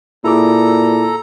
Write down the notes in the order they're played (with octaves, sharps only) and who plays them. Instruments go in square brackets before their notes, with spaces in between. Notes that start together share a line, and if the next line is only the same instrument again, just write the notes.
[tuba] A#2 [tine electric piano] E4 G#4 D6 [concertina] A4 A#5